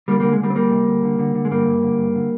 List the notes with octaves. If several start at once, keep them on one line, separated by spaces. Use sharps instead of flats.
D3 G3 A#3
D3 G3 A#3
G#3
D3 G3 A#3
C4
D2 G3 A#3
C3
D2
D3
D3
D3
G#3
G2 G3 A#3
G2
D3
G2
D3